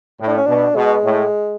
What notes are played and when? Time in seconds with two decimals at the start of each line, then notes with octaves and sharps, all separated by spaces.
0.20 A2
0.27 D4
0.38 C#4
0.46 B2 D4
0.76 B2 G#3
1.04 A2